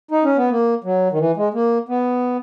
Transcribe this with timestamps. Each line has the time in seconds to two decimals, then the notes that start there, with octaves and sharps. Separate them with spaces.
0.11 D#4
0.24 C#4
0.37 B3
0.50 A#3
0.84 F#3
1.12 D#3
1.19 E3
1.36 G#3
1.54 A#3
1.89 B3